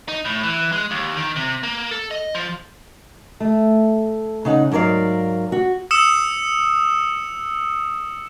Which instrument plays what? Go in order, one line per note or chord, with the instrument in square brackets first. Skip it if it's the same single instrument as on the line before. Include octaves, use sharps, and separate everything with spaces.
[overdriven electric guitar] D#4
A2
E3
G#3
D#2
D#3
C3
A#3
A4
D#5
F3
[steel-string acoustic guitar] A3
C#3 D#4 F#5
G#2 F#3 A#4 D5 F5
F#4
[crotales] D#6 E6 C#7 E7